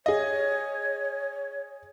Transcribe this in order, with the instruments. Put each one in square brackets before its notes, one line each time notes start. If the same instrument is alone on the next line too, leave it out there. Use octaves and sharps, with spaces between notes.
[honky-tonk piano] G#4 D#5 [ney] C#5